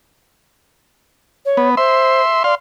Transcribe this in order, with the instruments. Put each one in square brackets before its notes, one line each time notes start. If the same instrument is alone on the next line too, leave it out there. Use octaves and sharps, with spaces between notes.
[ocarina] C#5
[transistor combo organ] B3
[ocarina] C5 [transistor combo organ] E5 C6
[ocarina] D5 [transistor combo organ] F5 C6